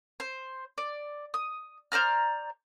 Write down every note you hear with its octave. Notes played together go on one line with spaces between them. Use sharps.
C5
D5
D#6
C5 D5 A#5 F6